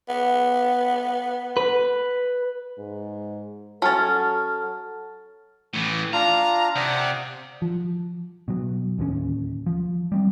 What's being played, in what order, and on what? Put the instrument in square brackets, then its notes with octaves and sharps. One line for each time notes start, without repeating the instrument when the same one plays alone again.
[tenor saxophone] B3
[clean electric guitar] B4
[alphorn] G#2
[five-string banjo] F#3 C#4 [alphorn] A4 [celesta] A5 F6 A6
[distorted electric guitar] A2 E3
[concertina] D4 F4 F5 [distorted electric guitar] A#5
[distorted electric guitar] C3 [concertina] D5 F#5 D#6
[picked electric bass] F3
B2 F#3
D1 D#2 D#3 C#4
F3
G3 A3 C4